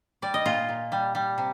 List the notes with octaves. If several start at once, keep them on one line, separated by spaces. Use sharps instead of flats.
G3 D5
D#5
A#2 F4
A#2
G3
G3
C3